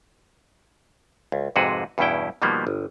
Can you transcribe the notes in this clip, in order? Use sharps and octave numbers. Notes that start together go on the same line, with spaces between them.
C#2
F2 G#2 C3 F#4 G#4 B4
E2 G2 B2 C#4 E4 G5
B2 D#3 F3 G3 A#3 B3
G1